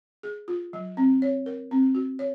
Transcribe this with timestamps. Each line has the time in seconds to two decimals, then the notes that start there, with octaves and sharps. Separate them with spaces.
0.23 G#4
0.48 F4
0.73 F#3
0.97 C4
1.22 C#5
1.46 A#4
1.71 C4
1.95 F#4
2.19 C#5